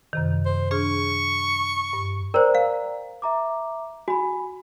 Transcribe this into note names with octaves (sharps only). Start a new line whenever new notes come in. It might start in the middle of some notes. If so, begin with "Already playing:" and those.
F#2 C3 D#3
C5
D4 G#4 C#6 F6
G2
A#4 C5 D5 G5 A#5
F5
E5 A#5 D6
F#4 G#5 B5